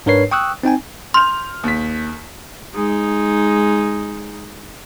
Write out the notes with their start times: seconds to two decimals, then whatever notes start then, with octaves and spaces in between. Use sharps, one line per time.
0.06 G#2 D4 A#4 B4 C#5 C7
0.31 G5 C#6 D#6 E6 F#6
0.63 C4 D#4 G5 G#5
1.14 C6 F6 G6 F7
1.64 D#2 B6
2.74 G#3 D#4